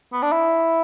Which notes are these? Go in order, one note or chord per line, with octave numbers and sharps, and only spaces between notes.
B3
D4
E4